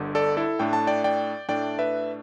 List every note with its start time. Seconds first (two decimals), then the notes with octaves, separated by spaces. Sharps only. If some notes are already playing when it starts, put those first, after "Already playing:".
Already playing: G1 G2 D3
0.15 A4 D5
0.37 E4 A4
0.59 A2 A3 D4 G5
0.73 A5
0.87 D5 G5
1.04 D5 G5
1.49 A2 A3 D4 D5 G5
1.79 B4 E5